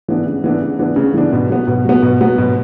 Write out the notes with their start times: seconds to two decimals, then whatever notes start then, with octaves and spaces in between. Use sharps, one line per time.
0.08 E3 B3 D4
0.26 C#3
0.44 E3 B3 D4
0.62 C#3
0.79 E3 B3 D4
0.96 C#3
1.14 E3 B3 D4
1.33 B2
1.49 F#3 B3
1.68 B2
1.85 F#3 B3
2.02 B2
2.21 F#3 B3
2.38 B2